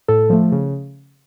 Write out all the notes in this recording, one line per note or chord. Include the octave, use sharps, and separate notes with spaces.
A2 A4
F3 A3
C#3